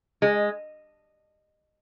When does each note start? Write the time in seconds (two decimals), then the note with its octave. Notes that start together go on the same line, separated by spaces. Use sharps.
0.22 G#3